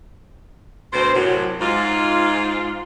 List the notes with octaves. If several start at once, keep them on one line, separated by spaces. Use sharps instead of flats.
D2 B2 C5
F#2 A2 C3 F#3
G#2 F4